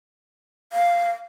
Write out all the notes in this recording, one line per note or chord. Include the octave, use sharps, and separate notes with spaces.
F5